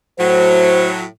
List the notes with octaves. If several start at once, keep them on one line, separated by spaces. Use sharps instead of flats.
A2 F#3 C5